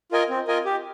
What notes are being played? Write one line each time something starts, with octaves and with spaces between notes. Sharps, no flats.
F4 A#4 D#5 G#5
C4
F4 A#4 D#5 G#5
G4